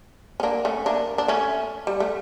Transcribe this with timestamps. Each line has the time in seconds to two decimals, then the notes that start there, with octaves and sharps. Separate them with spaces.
0.40 C#4
0.43 A#3 D4
0.65 A3 C#4
0.86 A#3 D4
1.18 D4
1.28 A3 C#4
1.87 G3
2.00 A3